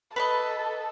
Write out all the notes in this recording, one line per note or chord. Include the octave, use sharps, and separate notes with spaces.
A4 B4 C#5 D#5